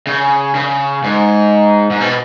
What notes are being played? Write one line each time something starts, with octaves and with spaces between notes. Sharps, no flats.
C#3
C#3
G#2
G#2
B2